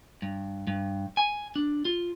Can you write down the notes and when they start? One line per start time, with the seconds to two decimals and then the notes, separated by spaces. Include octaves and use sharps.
0.22 G2
0.67 G2
1.17 G#5
1.56 D4
1.85 F4